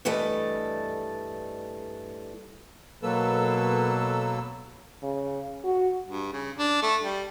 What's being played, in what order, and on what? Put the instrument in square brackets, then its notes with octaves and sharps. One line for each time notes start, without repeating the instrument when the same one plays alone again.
[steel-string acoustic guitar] G2 E3 G3 A3 A4 D#5
[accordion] B2 F#3 A#3 A4 B4 E6
[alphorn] C#3
F#4
[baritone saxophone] G2
C#3
D4
A3
G3